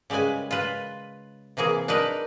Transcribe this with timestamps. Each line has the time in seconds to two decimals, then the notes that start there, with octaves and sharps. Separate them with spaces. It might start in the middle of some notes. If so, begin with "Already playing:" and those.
0.10 C#3 G3 G#3 B4 G#5
0.51 F4 B4
1.57 C3 E3 A#3 G#4
1.88 D4 D#4 A#4 B4